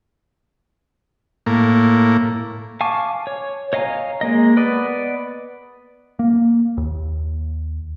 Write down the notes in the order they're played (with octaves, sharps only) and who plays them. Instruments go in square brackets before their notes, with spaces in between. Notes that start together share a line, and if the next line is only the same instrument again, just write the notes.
[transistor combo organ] A2 A#3
[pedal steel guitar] F5 G#5 A5 C#6 D6
C#5
C#5 D#5 F5 G#5 A#5
G#3 A#3 D#5
B3 B4 D5 D#5
[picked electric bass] A#3
D#2